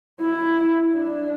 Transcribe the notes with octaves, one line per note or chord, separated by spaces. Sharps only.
E4
D4